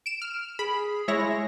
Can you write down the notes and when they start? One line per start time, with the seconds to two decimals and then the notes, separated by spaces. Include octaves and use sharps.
0.06 D7 E7
0.22 F6
0.59 G#4 B5
1.08 G#3 E4 C#5 A#6